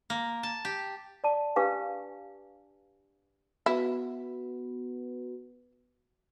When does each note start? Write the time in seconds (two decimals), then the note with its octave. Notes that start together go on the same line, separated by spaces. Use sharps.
0.10 A#3
0.43 A5
0.65 G4
1.24 D5 A5
1.56 D4 G4 B4 F5 G#5
3.66 B3 E4 F#4 B4